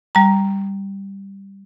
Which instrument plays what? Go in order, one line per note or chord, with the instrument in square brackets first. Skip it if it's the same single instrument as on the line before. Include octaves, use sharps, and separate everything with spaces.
[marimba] G3 A#5